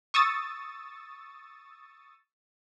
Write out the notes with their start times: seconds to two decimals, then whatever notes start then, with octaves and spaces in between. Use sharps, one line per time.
0.14 C#6 D#6 E6 A6